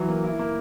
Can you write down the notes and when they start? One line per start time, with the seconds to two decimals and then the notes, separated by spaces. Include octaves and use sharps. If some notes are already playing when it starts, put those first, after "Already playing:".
Already playing: E3 F#3
0.09 A#3
0.24 E4
0.39 A#3